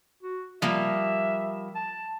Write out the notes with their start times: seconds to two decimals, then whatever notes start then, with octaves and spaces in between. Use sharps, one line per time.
0.23 F#4
0.62 F3 G3 A#3 E5
1.75 A5